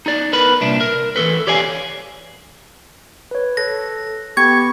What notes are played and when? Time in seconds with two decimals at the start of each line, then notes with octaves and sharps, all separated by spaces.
0.06 D#4 D5
0.33 B3 A#4 B4 B5
0.61 C2 A#2 D4 E5
0.81 A#4
1.16 E3 G#3 A4 B4
1.47 G4 C#5 D5 F5 G#5
3.31 B4 C#5
3.57 A4 F#6 A#6
4.37 B3 G4 B5 C#6 G#6